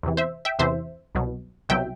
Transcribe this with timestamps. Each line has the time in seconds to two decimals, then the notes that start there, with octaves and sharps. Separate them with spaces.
0.03 E2 C3 E3
0.17 C5 E5
0.45 E5 G5
0.59 E2 C3 E3 C5 E5
1.15 C2 B2 F#3
1.69 C2 B2 F#3 E5 G5